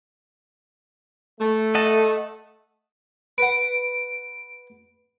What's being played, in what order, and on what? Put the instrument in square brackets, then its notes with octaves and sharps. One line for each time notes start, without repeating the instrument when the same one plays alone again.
[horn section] A3
[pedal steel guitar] D#5 F#5 A5
[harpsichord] B4 F#5 [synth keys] D7